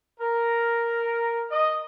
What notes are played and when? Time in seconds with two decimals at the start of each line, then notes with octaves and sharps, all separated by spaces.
0.20 A#4
1.51 D#5